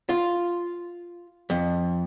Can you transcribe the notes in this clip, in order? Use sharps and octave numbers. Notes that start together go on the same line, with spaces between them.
F4
F2